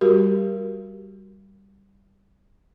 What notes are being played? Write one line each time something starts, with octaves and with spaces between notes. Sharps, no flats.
G3 F#4 G4 A#4